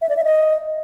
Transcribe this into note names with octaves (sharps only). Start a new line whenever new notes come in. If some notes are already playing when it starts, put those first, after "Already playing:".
E5
D5
E5
D#5